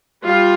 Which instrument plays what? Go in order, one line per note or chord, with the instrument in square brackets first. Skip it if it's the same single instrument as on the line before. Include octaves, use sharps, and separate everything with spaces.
[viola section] G3 F4